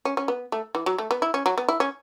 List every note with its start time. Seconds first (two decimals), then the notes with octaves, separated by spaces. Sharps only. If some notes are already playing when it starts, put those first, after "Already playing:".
0.05 C#4
0.17 C#4
0.28 B3
0.52 A3
0.75 E3
0.86 F#3
0.98 A3
1.11 B3
1.22 E4
1.34 C#4
1.46 F#3
1.58 B3
1.69 E4
1.80 C#4